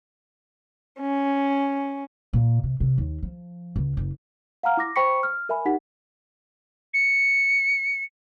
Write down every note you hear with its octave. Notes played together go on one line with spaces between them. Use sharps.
C#4
A#2
C3
C3
D#2
F3
C#2
F#1
F5 F#5 A#5 F6
E4 D6 A#6
C5 G5 B5 C#6 B6 C#7
F6
A#4 E5 G#5 B5
D#4 G4 F#5 B6
C#7